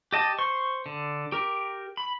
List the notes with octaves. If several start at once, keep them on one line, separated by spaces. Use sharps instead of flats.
G4 D#5 A5
C5 C#6
D3
G4 A#4
B5